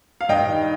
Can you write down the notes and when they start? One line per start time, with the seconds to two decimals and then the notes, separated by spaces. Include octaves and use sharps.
0.21 F5
0.29 G2 D#5 G5
0.49 D#3